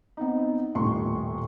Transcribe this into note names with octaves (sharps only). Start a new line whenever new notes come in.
B3 C4 D#4
D#1 A2 C6 C#6